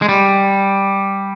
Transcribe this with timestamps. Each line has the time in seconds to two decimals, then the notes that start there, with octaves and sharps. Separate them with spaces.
0.02 G#3
0.09 G3